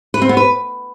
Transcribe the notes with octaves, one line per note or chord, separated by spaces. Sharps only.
B4
C4
B3
B4